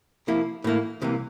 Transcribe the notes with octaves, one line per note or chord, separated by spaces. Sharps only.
C3 F3 A#3 E4
A2 E3 A#3 E4
C2 C3 E3 A#3